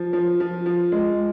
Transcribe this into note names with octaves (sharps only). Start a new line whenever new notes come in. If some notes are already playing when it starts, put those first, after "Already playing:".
Already playing: F3
F3
F3
F3
G#3